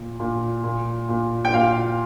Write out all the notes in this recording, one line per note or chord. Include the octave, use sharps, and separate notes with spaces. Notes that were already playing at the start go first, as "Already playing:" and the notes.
Already playing: A#2
A#2
A#2
A#2
G5
A#2 F5